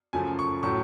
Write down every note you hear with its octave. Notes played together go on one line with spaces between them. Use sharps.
F#2 C#3 F3 A3 G#5
C#6
A2 F#3 A3 C#6